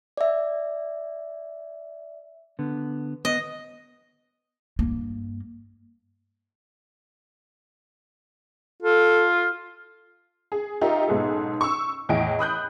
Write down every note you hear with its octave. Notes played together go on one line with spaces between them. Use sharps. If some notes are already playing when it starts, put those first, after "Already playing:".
D5 E5
D3 B3
B3 D#5
G2 A#3
F4 A4
G#4
D#4 F4 G4 A#4 E5
B1 G#2 B3 G#4 A4
C#6 E6
E2 A2 D#5 G5 G#5 D7
B5 D#6 F#6 G6